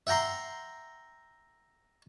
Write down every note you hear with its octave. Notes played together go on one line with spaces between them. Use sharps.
E5 F#5 G5 A#5 C6